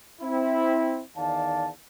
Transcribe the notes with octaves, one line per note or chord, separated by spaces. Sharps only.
C4 E4
E2 D#3 D5 F5 A5